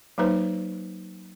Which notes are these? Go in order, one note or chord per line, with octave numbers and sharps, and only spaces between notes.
F#3 A#3 D#4 B4 C5